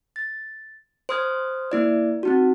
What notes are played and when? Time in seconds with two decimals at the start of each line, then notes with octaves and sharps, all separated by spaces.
0.16 A6
1.09 C5 C6 D#6 F6 G#6
1.72 A#3 E4 D5
2.23 C4 D#4 F#4